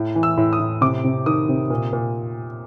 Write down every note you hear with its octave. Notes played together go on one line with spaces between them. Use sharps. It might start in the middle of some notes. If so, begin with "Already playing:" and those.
Already playing: A2
E3
E6
A2
D#6
A2
C3 D6
C3
D#3 D#6
C3
A#2
A#2